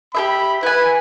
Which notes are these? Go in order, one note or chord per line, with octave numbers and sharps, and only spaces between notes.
G4 G#4 E5 B5
E4 B4 G#5